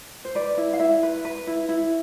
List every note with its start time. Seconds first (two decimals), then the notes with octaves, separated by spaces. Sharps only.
0.25 C5
0.35 B4 D5
0.57 E4
0.73 F5
0.80 E4 E5
1.03 B4
1.25 B4
1.47 E4
1.69 E4